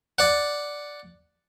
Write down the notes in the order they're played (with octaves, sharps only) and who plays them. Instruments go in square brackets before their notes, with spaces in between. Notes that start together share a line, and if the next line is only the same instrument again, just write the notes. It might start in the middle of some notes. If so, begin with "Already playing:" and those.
[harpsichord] D5 F#5